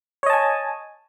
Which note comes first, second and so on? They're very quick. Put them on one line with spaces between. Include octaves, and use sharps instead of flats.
C#5 D#5 A5 G#5